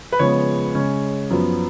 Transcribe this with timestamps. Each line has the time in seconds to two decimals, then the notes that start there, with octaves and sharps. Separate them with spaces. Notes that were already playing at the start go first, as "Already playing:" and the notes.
0.12 B4
0.19 C#3 F3 G#3 B3 C#5
0.75 C#3 G#3 C#4
1.30 F#2 F3 B3